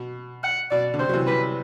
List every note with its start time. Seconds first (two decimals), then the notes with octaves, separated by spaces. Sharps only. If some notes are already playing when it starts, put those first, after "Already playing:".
Already playing: B2
0.44 F#5
0.71 B2 D5
0.94 D3
0.99 C3 C5
1.09 F#3
1.13 C3 E3
1.27 E3 G3 B4